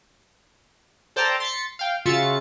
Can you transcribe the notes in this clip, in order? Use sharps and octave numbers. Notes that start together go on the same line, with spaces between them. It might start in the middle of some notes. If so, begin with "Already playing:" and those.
A4 C5 D5 G5 A5 A#5
C6 A6 B6 C#7
F5 G5
C#3 F4 F#4 E5 A6 C#7